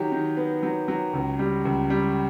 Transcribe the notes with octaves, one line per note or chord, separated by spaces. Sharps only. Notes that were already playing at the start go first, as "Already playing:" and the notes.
Already playing: D#3 F#3 G4
D#3
B3
F#3
F#3
C#2
G3
C#2
G3